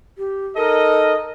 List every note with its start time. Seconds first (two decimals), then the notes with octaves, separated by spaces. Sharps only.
0.18 G4
0.57 D#4 A4 A#4 D#5